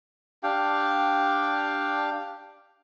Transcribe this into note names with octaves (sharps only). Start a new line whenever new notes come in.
D4 G4 F5 G5